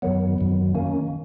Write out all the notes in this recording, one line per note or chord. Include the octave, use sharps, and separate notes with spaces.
F#2 D#3 F#3 B3
F#2 D#3 F#3
D#3 A#3 C#4